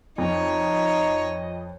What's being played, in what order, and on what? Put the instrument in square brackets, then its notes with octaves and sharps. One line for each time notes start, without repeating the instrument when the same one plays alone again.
[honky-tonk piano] F2 [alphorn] D#4 [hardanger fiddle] C#5 [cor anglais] D#5